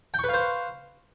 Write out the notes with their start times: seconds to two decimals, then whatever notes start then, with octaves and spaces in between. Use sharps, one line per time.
0.14 G5
0.19 C#6
0.24 B4
0.29 F5
0.34 C5